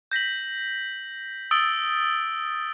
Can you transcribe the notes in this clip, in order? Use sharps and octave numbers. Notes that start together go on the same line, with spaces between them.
G6 A#6 B6 F#7
D#6 E6 A6 D7 G7